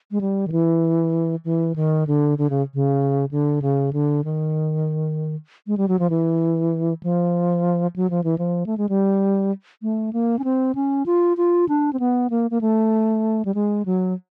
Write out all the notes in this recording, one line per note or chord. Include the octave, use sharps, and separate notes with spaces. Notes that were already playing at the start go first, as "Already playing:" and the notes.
G#3
G3
D#3
E3
E3
D#3
D3
D3
C#3
C#3
D3
C#3
D3
D#3
G#3
G3
F#3
F3
E3
F3
F#3
F3
E3
F3
A3
G#3
G3
A3
A#3
C#4
C4
C#4
F4
F4
D4
C4
B3
A#3
A#3
A3
G3
G#3
F#3